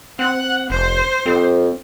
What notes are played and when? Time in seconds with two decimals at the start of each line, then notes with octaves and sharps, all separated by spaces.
0.19 C4 F#5
0.70 F1 C5
1.26 F2 C4